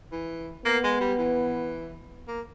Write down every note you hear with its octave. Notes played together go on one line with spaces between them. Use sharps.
E3
A#3 B3
G#3
G3
E3
A#3